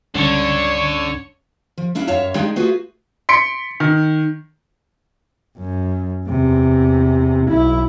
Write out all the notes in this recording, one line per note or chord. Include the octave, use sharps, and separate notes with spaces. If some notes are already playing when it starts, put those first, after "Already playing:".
C#2 G2 D3 C#4 C#5 C#6
F3
C#4 D4 E4 F5
F#2 C#5 E5 F5 A5
G#3 D4 D#4 G#4 G5
A3 B3 F4 F#4 G#4 B4
C6 B6 C#7 D7
D#3
F#2
E2 C3
B1 E4